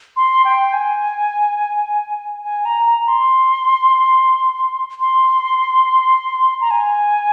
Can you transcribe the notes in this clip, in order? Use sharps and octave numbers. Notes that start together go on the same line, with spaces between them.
C6
G5
G#5
G#5
A#5
A#5
C6
C6
A#5
G#5